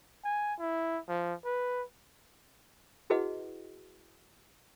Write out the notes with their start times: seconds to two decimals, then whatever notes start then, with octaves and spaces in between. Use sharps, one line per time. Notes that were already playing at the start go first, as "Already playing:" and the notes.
0.25 G#5
0.59 E4
1.09 F3
1.46 B4
3.10 E4 F#4 G#4 B4 D#5 F#5